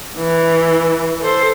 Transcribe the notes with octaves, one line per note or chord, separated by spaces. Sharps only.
E3
A4 C5